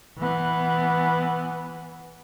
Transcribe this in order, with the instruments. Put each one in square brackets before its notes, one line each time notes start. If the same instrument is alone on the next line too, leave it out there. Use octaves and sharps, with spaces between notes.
[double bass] E3 B3